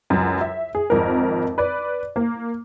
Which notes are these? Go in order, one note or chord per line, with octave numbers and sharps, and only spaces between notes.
C#2 F#2
E5
G#4
G#1 F2 A#4
B4 D5
A#3